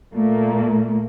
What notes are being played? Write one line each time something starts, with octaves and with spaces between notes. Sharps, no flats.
A#2 A3 A#3